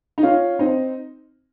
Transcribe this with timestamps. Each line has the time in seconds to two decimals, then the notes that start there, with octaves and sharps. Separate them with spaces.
0.18 D#4
0.23 C#4 F4
0.59 C4 D#4